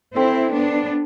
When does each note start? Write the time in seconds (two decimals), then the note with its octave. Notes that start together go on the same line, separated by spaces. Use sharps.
0.15 C4 E4 A4 C5 G5 C6
0.53 B3 D4